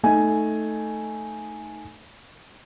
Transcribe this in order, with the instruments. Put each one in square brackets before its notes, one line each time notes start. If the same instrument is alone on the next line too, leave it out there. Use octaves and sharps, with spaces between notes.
[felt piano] A3 D#4 G#5